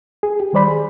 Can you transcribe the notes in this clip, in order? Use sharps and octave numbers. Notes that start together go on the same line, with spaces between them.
G#4
G4
D#3 G3 C5 D5 B5
G#4